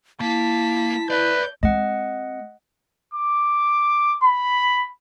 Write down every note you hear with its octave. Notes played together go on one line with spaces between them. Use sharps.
A#3 E4 A5 B6
B4 D5 E5 G6
G#3 C4 D#5 F#5
D6
B5